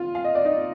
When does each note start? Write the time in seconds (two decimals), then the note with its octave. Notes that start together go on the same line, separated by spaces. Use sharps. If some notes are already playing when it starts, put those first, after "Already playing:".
Already playing: F4 F5
0.15 F5
0.25 D#5
0.35 D5
0.45 D#4 D#5